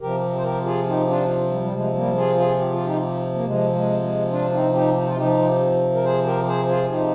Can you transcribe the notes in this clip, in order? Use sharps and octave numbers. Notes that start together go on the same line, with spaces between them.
C3 F3 G4 A#4
C5
G4 A#4
F4 G#4
D#4 G4
D4 F4
G3
G3
C3 F3 G#3
G3 A#3
F4 G#4
F4 G#4
G4
F4
D#4 G4
A#3
C3 F3 G#3
G#3
G#3
D4 F4
C4 D#4
D#4 G4
F4
C3 F3 D#4 G4
A#4
G#4 C5
G4 A#4
G#4 C5
F4 G#4
C3 F3 D#4 G4